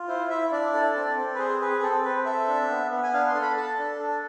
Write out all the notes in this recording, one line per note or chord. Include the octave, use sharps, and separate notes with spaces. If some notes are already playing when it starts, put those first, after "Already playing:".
Already playing: F4
E4 C5
E4 E5
D4 D5
A4
C4
C4
B4
G#4 C5
G#4 B4
C4 A4
C4 B4
A4 E5
D4
B3
B3
G#5
D4 F5
C6
A4
B5
A4 A5
D4
A4